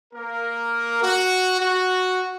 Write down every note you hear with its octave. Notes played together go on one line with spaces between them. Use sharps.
A#3 A#4
F#4
F#4